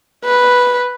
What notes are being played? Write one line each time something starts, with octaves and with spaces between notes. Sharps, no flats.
B4